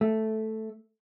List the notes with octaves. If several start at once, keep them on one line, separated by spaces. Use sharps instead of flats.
A3